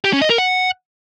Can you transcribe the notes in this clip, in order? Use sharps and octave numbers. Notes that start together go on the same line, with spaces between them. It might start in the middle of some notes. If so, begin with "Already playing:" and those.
G4
C#4
D#5
A#4
F#5